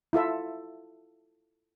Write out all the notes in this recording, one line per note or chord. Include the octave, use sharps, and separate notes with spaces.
E4 F4 A4 E5